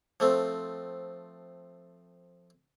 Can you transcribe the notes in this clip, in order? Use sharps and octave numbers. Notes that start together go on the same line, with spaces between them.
F3 A3 C4